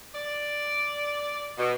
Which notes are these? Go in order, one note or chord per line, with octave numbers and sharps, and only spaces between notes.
D5
B2